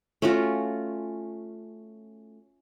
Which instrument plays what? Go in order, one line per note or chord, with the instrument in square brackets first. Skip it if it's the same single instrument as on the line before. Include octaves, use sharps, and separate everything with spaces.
[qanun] A3 C#4 F4 F#4